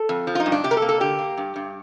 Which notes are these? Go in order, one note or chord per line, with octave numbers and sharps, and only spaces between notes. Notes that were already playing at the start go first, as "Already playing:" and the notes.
Already playing: A4
F2
F3
F4
D#4
G2
D4
C3 G4
A#4
A4
A#3
A4
D3 G4
A#3
G2
G2